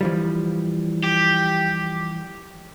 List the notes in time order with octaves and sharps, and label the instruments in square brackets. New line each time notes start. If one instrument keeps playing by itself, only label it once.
[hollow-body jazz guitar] E3 F3 G3
[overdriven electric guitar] G4